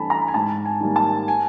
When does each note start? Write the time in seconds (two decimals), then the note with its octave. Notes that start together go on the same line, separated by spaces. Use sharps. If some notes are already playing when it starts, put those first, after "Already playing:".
Already playing: G2 E3 A3 D4 A5 B5
0.10 A#5
0.28 G#5
0.34 G#2 A5
0.65 G#5
0.81 D#3 G3 A#3
0.96 A5
1.28 G#5